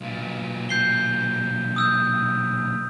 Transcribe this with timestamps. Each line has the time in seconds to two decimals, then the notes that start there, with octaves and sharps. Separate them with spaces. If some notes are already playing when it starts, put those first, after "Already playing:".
0.01 B1 A#2
0.69 G6 C7 G7
1.76 D#6 E6 G6